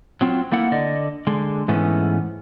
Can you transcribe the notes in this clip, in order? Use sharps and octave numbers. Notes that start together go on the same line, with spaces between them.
F#3 C4 F4
A3 A#3 E4 F#5
D3 D5 D#5
D3 G#3
G#2 E3 A3 B3 C#4